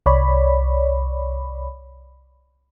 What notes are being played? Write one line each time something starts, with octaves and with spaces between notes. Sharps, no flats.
C2 C#5 D5 B5